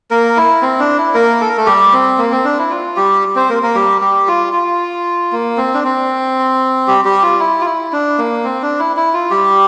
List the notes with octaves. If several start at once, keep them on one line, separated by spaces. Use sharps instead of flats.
A#3 A#4
E4
C4
D4
E4
A#3 A#4
A4
A#4
A3 A4
G3 G4
C4
A#3
C4
D4
E4
F4
G3 G4
C4 C5
A#3 A#4
A#3 A#4
G3 G4
G3 G4
F4
F4
A#3
C4
D4
C4
G3 G4
G3 G4
F4
E4
F4
E4
D4
A#3
C4
D4
E4
E4
F4
G3 G4